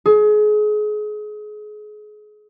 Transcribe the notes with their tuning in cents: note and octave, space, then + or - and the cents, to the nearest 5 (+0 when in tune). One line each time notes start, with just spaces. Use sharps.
G#4 +30